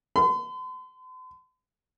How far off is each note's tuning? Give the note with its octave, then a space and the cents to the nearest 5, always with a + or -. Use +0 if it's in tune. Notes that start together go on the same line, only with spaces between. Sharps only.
C6 -45